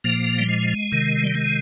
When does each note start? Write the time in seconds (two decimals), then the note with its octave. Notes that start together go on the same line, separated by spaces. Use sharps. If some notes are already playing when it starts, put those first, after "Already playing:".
0.04 A#2 F3 A#3
0.38 G3
0.48 G#3
0.92 C3 D#3
1.23 G3
1.35 G#3